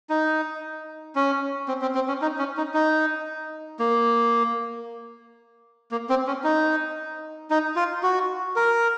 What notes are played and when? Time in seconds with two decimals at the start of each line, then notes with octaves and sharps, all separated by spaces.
0.10 D#4
1.15 C#4
1.68 C4
1.82 C4
1.95 C4
2.08 C#4
2.22 D#4
2.39 C#4
2.57 D#4
2.74 D#4
3.80 A#3
5.91 A#3
6.10 C4
6.27 C#4
6.44 D#4
7.51 D#4
7.76 F4
8.03 F#4
8.56 A#4